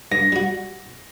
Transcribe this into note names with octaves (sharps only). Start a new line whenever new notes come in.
G2 A#6
G3 F#4